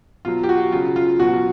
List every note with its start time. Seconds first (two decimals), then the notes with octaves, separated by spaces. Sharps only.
0.25 B2 F#3 F4
0.43 G4
0.49 F#4
0.72 C#3 F#3 F4
0.96 F4
1.20 B2 F#3 F#4
1.33 F4